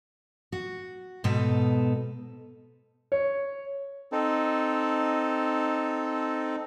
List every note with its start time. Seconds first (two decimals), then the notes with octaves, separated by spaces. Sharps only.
0.52 F#4
1.24 G#2 B2 D#4 A4 B4
3.12 C#5
4.12 C4 D#4 A4